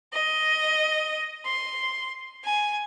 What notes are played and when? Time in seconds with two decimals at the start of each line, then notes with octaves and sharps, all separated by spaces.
0.13 D#5
1.45 C6
2.46 G#5